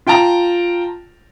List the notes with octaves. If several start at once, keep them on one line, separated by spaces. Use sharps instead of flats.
F4 G5 A5 A#5